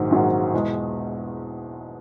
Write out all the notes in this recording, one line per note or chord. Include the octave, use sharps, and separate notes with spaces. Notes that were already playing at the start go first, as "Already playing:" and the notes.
Already playing: A#1 G#2 D#3 F#3
A#1 G#2 D#3 F#3
E2 B2 G#3